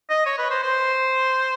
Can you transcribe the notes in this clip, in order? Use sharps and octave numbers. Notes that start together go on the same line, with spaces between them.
D#5
C#5
B4
C5
C5